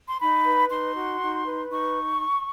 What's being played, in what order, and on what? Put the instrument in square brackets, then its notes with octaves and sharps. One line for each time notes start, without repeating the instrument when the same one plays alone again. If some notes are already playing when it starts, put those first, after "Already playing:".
[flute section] C6
D#4 B5
B4
D#4 C6
F#4
D#4
B4
D#4 C#6